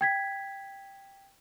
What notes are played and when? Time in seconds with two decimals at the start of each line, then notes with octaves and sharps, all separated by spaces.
0.01 G5 G#6 B6